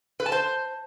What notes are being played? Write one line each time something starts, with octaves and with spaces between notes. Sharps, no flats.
B4
A5
C5